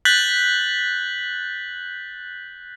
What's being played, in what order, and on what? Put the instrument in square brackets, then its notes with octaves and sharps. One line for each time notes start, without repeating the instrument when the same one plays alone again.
[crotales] F#6 G6 A6 B6 F#7